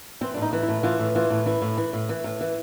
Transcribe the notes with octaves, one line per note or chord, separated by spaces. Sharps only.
E3 C4
A2 D4
D#4
E3
E4
A2
E3 F4
A2
E3 F4
A2
E3 E4
A2
E3
A2
E3
A2
E3